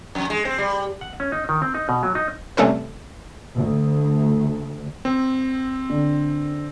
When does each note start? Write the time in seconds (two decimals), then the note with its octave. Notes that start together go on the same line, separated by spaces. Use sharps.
0.15 F2
0.30 G#3
0.45 C4
0.58 G3
1.01 F#5
1.20 C#4
1.32 D#4
1.49 D#3
1.62 C4
1.75 D#4
1.89 B2
2.03 F#3
2.15 D#4
2.57 C3 G3 A3 C#4 A4 B4
3.56 D2
5.05 C4
5.90 D3